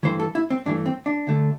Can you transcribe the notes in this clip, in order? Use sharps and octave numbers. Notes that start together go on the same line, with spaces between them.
G2 E3 A3 C5
A4
E4
C4
G2 E3 A3 D4
C4
D4
D2 D3 A3